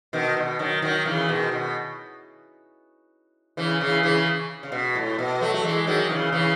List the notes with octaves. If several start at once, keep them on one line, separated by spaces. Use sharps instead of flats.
B2 D#3
B2
D#3 F#3
D#3 F#3
C#3 E3
B2 D#3
B2
C#3 E3
C#3 E3
C#3 E3
C#3
B2
A2
B2
F#3 A3
A3
E3 G#3
D#3 F#3
C#3 E3
C#3 E3